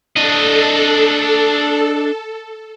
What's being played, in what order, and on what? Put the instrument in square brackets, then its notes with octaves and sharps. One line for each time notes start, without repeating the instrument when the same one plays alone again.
[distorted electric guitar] D4 D#5 [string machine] A4